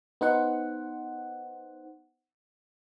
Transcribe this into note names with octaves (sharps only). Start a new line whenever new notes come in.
B3 D#4 C5 F#5